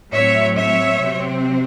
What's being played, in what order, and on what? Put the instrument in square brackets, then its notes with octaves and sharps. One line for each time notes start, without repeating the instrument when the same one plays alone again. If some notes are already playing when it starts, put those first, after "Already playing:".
[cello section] A2 F#3 A3 C4 C#5 E5
C#5 E5
C3 F#3 C4